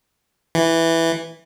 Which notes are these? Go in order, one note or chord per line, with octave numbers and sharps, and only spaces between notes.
E3